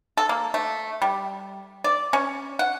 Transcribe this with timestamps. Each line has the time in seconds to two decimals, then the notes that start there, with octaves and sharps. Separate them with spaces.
0.17 A4
0.29 A#3
0.54 A3
1.02 G3
1.84 D5
2.13 C#4
2.59 F#5